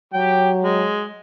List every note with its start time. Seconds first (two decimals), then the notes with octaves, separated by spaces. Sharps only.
0.14 F#3 G4 G5
0.63 G#3